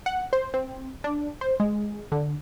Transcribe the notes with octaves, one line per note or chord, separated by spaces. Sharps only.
F#5
C5
C4
D4
C5
G#3
D3